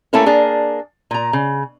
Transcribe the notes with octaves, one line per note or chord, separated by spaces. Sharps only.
A3 A#3 C#4 E4 A4 A#4
A#3 D4 G#4
A#2 A#5
C#3